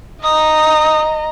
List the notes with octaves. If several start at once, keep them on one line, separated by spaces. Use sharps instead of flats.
D#5 A#5 D#6